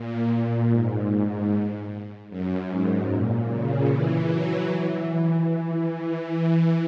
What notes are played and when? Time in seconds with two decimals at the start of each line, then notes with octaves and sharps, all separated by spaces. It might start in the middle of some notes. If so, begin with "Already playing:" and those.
Already playing: A#2
0.72 G#2
2.30 F#2
2.70 G#2
3.10 A#2
3.49 C#3
3.89 E3
4.29 F#3
4.68 E3